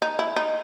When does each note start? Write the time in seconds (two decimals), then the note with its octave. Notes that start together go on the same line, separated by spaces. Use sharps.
0.02 D#4
0.19 E4
0.36 D#4